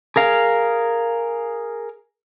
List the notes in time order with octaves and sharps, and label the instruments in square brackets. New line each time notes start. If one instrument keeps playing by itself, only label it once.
[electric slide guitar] G#4 A#4 F5